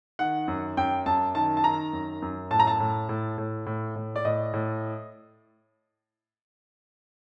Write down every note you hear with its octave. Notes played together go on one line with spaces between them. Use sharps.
D#3 F#5
F#2
F#2 G5
F#2 A5
D#3 A5
A5
D#3 A#5
F#2
F#2
A2 A5
A#5
A5
A2
A2
A2
A2
A2
D5
A2 D#5
A2